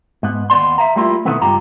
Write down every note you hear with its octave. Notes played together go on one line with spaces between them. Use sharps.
G#2 B3
D#2 B3 D5 C6
E5 F5 A#5
G3 A3 A#3 E4 F4
B2 D#3 E3 A3 B3 C4
C#2 G2 F4 G4 A#5